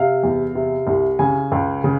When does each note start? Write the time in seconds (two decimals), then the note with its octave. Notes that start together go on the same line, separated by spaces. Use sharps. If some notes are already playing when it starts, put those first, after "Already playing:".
Already playing: C3 F5
0.23 E2
0.55 C3
0.87 C2
1.19 C#3 G#5
1.52 C#2
1.84 C#3